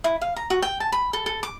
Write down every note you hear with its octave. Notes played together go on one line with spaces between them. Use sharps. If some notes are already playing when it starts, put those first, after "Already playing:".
E4
F5
A#5
F#4
G5
A5
B5
A4
A4
D6